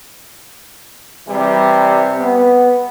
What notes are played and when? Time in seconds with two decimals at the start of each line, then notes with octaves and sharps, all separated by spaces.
1.27 C3 E3 G3
2.18 B3